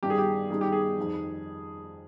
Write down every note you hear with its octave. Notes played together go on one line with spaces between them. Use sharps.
G2 D#3 G4
G#4
G4
G2 D#3 G#4
G4
G#4
F2 D#3